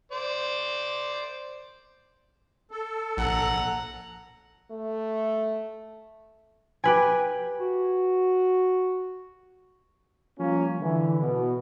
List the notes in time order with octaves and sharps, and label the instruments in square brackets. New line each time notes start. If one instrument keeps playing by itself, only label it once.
[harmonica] C5 D5
[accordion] A4
[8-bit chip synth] A#1 [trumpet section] F#5 A#5
[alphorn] A3
[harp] G4 B4 G#5
[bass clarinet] F#4
[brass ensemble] F3 G3 A#3 C#4 F4
D3 E3
B2